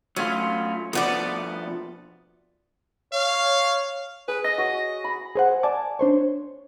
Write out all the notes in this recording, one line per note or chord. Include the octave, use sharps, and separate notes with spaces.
F#3 A3 C#4 F4
B2 F3 A3 B3 D5
C#5 F5
G#4 B4
D#5 E6 A#6
F#4 C#5
B5
G#4 C5 F#5
D5 G#5 A5 D6
D4 C5 C#5